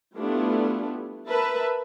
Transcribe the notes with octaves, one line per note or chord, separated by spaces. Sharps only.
G3 A3 B3 D4 E4 F4
A#4 B4 E5 A5 B5